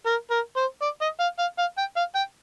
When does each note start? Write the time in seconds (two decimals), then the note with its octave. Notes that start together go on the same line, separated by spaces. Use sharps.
0.06 A#4
0.31 A#4
0.57 C5
0.82 D5
1.01 D#5
1.20 F5
1.39 F5
1.58 F5
1.78 G5
1.97 F5
2.15 G5